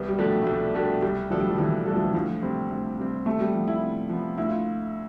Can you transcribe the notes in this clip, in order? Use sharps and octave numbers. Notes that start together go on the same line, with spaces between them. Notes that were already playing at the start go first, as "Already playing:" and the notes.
Already playing: C2 B3
G3
B2 F3 A3 D4 G4
A3
C2 G3
B2 A3 D4 G4
C2 G3
B2 F3 A3 D4 A4
G3
F3
C2 E3
B2 G3 A3 D4 A4
F3
E3
D2 F3
C3 G3 C4
D2
C3 G3 C4
C3 A3
G3
F3 B3
E4
C3
F3 B3
D2 E4
F4